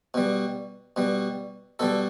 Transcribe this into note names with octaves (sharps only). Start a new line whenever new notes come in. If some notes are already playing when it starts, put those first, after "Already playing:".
B2 G3
B2 G3
B2 G3 A4